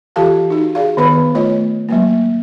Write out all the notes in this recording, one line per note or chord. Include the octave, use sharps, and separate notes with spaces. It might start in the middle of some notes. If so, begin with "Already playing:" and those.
E3 F4 G4 A4 F5 A5
D#4 F#4
G#4 D5 F5
D#3 B3 B4 B5
A3 F4 C#5 D#5
F#3 G#3 A#3